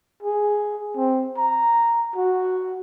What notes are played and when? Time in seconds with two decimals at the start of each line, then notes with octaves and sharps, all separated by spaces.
0.23 G#4
0.97 C4
1.38 A#5
2.16 F#4